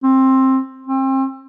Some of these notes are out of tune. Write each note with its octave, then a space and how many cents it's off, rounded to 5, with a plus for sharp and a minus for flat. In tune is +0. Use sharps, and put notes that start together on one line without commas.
C4 +15
C4 +35